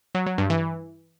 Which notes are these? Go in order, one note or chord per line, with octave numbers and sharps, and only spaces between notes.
F#3
F#3
G2
E3